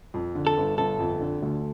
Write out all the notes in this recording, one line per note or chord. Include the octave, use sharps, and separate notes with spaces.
F2
D3
A4
G1
G1 A4
F2
D3
D2